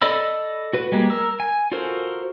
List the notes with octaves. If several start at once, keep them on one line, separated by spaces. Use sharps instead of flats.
A4 D5 D#5 B5 E6
F#4 B4
G3 G#3 A#3
A#4 E6
G#5
F4 F#4 A4 A#4 C5